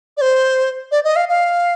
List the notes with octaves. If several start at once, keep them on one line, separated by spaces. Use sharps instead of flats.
D5
C5
D5
D#5
F5
F5